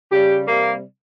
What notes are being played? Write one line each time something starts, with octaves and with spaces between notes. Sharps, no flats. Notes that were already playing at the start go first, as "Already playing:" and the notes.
C#3 G3 G4
C3 G3 A#3